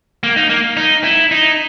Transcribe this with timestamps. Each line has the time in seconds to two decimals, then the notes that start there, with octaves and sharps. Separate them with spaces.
0.23 A#3
0.36 D#4
0.49 A#3
0.77 D#4
1.04 E4
1.31 D#4